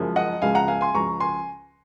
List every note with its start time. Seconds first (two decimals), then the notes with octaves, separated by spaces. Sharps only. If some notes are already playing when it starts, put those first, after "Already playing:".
Already playing: F#1 F#2 F3 G#3
0.16 D#5 F#5
0.41 C#2 C#3 F3 G#3 F5 G#5
0.55 F#5 A#5
0.68 F5 G#5
0.81 G#5 C6
0.94 C#2 C#3 F3 A#5 C#6
1.20 G#5 C6